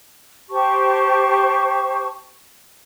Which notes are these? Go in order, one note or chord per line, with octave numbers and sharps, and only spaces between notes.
G4 C5 A5 C#6